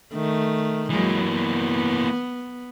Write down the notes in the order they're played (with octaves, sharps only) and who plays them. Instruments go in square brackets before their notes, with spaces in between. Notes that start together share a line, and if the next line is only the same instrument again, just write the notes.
[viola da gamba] D#3 A3
[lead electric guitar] E3 A#3 [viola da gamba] F#3 G#3
[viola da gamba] B3